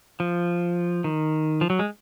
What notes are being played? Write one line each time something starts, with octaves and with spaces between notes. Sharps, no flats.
F3
D#3
F3
F#3
G#3